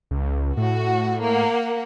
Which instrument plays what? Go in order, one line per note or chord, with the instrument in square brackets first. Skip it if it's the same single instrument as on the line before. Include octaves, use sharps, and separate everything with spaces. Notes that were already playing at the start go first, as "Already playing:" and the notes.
[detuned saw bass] C#2
[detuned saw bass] A2 [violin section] F#4
[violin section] A#3 F#5